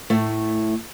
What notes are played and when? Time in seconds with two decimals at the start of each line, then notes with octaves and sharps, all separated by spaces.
0.10 A2 A3